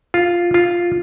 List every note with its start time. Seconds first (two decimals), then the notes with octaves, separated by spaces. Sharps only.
0.14 F4
0.54 F4